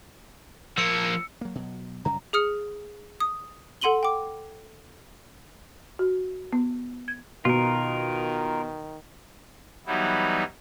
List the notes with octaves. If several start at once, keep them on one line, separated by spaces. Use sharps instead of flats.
F3 A#3 E6 C#7
F#3 A#3
B2 F#3
F#2 C#3 G3 A#5
G#4 D#6 F6 C#7
D#6
A4 F#5 C6 D#7 F#7 G7
G5 D6
F#4
B3
G#6
B2 D#3 F4 A#4
E3 F#3 G3 B3 D#4 E4